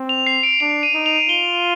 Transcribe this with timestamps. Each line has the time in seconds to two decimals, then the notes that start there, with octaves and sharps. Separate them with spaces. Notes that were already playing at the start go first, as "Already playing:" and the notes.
Already playing: C4
0.09 F7
0.27 C7
0.43 D7
0.60 D4 F7
0.83 D#7
0.94 D#4
1.06 F7
1.29 F4 G7